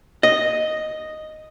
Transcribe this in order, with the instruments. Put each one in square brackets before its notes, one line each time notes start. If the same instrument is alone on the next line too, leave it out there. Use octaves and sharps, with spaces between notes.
[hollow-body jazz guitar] D#5